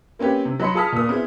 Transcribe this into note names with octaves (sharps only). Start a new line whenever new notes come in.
A#3 C4 C#4 G4 B4
C3
F#3 D#5 B5 C6 C#7
F4 G#4 A5 D#6 F6 B6
A#2 A#3 D#6
B3 C4 E4 G#4